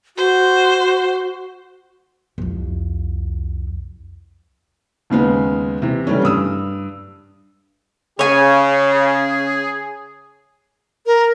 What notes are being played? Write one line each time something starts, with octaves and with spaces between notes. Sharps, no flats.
F#4 C5
C2 F2
D#2 C#3 G#3 B3
C3 E3
C#3 E3 G3 A3 C#4
G2 D#6 E6
C#3 G#4 C#5 G#5
A#4